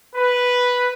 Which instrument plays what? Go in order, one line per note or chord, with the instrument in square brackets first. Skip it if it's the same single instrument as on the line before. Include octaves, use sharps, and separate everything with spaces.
[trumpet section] B4